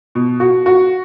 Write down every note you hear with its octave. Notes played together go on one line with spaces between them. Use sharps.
B2
F#4
F#4